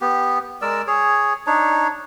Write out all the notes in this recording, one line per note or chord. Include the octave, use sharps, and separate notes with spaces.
B3 G4
G#3 A#4 D5 E6
G#4 C#5
D4 D#4 C#5